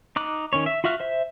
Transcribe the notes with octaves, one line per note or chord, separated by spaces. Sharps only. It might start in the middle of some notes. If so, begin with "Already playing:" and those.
D#4 D6 F#6
D#3 C#4 C#5
E5
F4 F#4 E5 F6 F#6
C5 E5